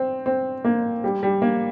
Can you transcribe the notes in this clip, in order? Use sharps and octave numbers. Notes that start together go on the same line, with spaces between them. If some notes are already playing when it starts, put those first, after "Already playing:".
Already playing: C4
C4
A#3
G3
G3
A#3